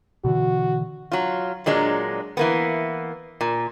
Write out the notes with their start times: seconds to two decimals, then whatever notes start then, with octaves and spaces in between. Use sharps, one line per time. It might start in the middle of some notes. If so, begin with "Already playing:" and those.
0.24 B2 D3 E3 F#4
1.12 F#3 F4
1.66 A#2 F#3 G#3 D4
2.37 E3 A#3 B3
3.41 A#2